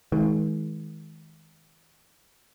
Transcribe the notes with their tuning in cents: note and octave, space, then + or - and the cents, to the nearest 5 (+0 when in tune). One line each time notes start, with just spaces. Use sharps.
D#3 +45 G#3 +25